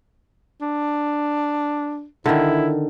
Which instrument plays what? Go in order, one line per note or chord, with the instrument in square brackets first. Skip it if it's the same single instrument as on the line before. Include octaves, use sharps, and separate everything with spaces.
[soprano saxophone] D4
[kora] D3 D#3 [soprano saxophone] E4